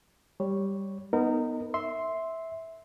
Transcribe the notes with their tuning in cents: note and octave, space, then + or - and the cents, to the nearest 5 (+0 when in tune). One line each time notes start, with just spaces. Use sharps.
G3 +0 C#5 +0
B3 +0 D#4 +0 A#4 -25
E5 -10 C6 +0